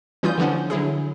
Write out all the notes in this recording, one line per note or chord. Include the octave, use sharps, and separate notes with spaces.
E3 G3 C#4 F4 D#6 G6
D3 E3 F3 B3 C#4
D3 F#3 E4 G#4